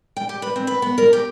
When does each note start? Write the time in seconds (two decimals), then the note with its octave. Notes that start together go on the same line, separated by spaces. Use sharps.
0.16 G5
0.29 G4
0.42 B4
0.56 C4
0.67 B4
0.82 B3
0.98 A#4
1.13 G4